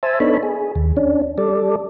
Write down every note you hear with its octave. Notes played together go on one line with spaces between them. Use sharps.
C5 E5 G#5 A5
B3 D4 D#4 A4 C#5 B5
G#4
D#2
C#4 D4
G3 A4 D5